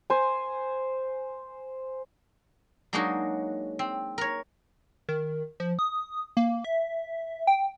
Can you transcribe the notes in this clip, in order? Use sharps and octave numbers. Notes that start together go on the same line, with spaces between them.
C5 G#5
F#3 G#3 A#3 D4 D#4 F#4
C4
A#4 C#5
D#3
F3
D#6
A#3
E5
G5